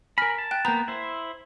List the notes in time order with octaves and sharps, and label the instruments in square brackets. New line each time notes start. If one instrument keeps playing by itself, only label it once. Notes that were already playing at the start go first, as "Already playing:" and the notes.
[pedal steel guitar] A#4 B5 [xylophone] G#5 F6 A#6
[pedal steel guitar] A5
[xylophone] G5 F#6
[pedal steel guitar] A#3 B3 [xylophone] A#5 G6
[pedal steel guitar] E4 C5